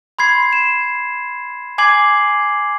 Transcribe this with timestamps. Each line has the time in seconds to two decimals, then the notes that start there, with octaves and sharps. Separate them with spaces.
0.19 B5 C6 G#6 C7
0.53 E7
1.78 G#5 D6 G#6 C7 F#7